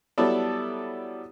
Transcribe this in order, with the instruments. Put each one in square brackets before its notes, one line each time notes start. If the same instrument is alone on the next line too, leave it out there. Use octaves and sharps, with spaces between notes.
[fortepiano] F#3 G3 B3 E4 A4 D5